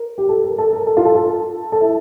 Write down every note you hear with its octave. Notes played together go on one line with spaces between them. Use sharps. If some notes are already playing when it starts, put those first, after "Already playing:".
Already playing: A#4
G4
A4
A#4
A4
A#4
A4
F4
A4
A4
A4
E4